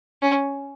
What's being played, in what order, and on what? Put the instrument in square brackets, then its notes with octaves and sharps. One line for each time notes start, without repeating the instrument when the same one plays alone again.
[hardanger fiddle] C#4